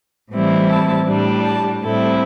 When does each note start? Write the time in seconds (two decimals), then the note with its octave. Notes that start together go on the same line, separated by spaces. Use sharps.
0.31 A2 E3 G3 C4 E4
0.69 A5
1.07 A2 G3 D4
1.45 A5
1.83 A2 G3 C4 E4 A4